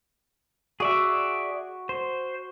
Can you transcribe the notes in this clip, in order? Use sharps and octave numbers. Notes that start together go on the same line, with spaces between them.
F#4 G#4 D5 E5
C5